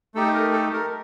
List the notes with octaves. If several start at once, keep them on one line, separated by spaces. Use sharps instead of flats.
A3 D#4 G4 A4
A#4
A4
A#4